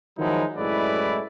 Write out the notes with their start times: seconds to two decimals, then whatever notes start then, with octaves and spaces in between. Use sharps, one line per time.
0.18 D#3 F3 F#3 G#3 D#4 E4
0.56 F#2 A2 G#3 E4 B4 D5